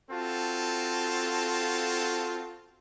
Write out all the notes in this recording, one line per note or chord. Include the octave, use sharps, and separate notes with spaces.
C4 F4 F#4 A4 A5